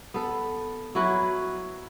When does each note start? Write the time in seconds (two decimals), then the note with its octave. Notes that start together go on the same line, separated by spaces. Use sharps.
0.14 B3 A4
0.95 F#3 E4 F#4 B4